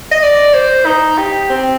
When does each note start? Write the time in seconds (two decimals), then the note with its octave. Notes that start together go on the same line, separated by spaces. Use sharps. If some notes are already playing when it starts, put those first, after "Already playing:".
0.12 D#5
0.23 D5
0.54 C5
0.86 D#4
1.18 G4
1.50 C4